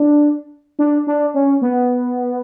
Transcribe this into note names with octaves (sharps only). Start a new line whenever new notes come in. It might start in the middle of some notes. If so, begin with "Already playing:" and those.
Already playing: D4
D4
D4
C#4
B3